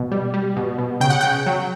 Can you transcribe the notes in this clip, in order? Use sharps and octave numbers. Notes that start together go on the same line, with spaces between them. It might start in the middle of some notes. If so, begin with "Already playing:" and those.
Already playing: B2
G3
G3
B2
B2
C#3 G5
F#5
C#3 G5
F#3